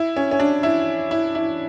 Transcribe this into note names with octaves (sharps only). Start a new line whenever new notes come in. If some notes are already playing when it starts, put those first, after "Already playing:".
Already playing: E4
C#4
C#4
D4
E4
E4
E4